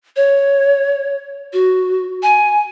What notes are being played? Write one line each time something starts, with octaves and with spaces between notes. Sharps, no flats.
C#5
F#4
G#5